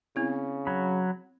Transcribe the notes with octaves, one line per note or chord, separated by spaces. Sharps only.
C#3 B3 C4 E4
F#3 B5